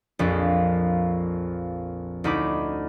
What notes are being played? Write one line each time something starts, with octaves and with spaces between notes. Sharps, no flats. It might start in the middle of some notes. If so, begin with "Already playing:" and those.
A#1 F2
D2 D#4 E4 B5 D6